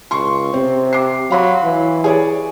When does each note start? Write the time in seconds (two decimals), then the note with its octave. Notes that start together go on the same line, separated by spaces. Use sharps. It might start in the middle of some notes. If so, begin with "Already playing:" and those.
0.11 C#2 C6 C#6
0.53 C3 C4
0.93 D6 C7
1.31 F#3 F5 B5 C6
1.64 E3
2.04 G#4 C#5 D5